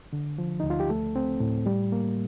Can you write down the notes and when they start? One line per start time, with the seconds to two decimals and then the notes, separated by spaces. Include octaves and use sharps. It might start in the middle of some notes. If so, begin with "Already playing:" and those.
0.13 D3
0.38 F3
0.60 D2 D#4
0.70 F4
0.80 G4
0.90 A3 A4
1.16 C4
1.40 A2
1.66 G3
1.92 A#3